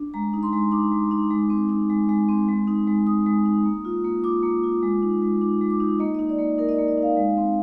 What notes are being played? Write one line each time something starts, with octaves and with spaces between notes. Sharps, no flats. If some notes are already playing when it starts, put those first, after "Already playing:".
Already playing: D4
G#3 A#5
D#4
C6
G#3
D#4 D6
G#3
D#4
G#3
C4
D#4
G#3
G#3
C4
G#3
D#4
G#3
D#4 D#6
G#3
D#4
A#3
F4
A#3
F4 D6
A#3
F4
G#3
D#4
G#3
D#4 D6
G#3
D6
D#4
A#3 D#5
D#4 D#5
D5
A#3
D#4 A#4
D#5
D5
A#3
D#5
D#4 F5
G#3
C4